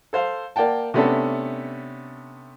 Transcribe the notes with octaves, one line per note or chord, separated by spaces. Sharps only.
A4 C5 F5
A#3 D5 F#5 G5 A5
C3 A3 B3 C#4 D4 A4